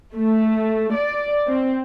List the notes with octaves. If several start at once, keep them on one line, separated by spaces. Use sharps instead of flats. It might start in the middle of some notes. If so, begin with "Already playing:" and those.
A3
D5
C4